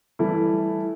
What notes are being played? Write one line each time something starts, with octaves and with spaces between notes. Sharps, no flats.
E3 G3 A3 E4